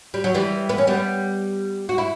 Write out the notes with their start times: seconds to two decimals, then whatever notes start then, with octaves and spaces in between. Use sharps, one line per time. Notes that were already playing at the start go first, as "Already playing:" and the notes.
0.14 G3
0.24 F#3
0.34 E3 G3
0.69 B3
0.78 C#4
0.87 G3 B3
1.89 F#4
1.98 E4